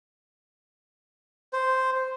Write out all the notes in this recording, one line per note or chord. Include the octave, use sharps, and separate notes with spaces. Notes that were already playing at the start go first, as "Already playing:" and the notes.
C5